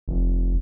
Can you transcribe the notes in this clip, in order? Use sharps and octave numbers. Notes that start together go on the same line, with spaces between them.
F1